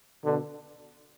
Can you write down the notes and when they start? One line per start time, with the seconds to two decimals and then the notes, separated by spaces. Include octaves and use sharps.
0.25 B2 D3